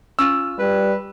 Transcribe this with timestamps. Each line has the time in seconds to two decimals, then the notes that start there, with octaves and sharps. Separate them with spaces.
0.19 C#4 F4 E6
0.59 G3 B4